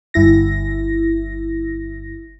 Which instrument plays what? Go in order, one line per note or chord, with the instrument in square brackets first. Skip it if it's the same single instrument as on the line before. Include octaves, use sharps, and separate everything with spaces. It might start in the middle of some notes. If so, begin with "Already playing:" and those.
[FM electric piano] G1 E4 A#6